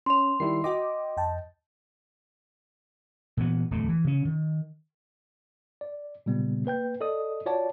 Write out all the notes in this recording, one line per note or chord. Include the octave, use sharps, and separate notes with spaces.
C#4 C#5 C6 F7
D#3 G3 E4 C7
F#4 D#5 G5 D6
F2 G5 A5
A#2 E3 B3
D1 E2 A2 A3
E3
C#3 C#4
D#3
D5
A#2 C#3 G3 B3
A#3 B4 G5 G6
A4 D5 D#5 D#6
F4 F#4 C#5 D5 F#5 A5